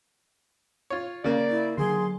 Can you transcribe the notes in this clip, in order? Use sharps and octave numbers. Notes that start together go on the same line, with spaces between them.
F4 C#5
C#3 A#3 D5
E4
D3 F#3 G#4 C6